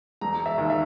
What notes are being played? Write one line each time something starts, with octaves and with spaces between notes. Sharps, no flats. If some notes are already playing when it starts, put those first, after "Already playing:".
E1 A#5
E5
D#2 D#3
E5